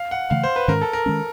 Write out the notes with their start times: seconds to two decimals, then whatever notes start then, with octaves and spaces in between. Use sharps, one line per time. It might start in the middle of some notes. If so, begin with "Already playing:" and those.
Already playing: F5
0.11 F#5
0.30 C#3 E3 A3 F5
0.43 C5
0.56 B4
0.68 G#2 D#3 G#3 C#4 A#4
0.81 A4
0.93 A#4
1.06 D#3 G#3 C#4